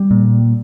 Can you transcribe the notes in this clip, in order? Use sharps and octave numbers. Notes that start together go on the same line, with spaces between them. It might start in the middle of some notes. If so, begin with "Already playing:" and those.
Already playing: G3
A#2